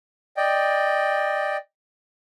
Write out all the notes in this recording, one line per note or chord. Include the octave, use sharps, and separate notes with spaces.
D5 D#5 G5